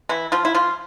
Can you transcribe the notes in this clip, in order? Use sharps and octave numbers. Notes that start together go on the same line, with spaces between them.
E3 E4
F3 F4
E4
F3 F4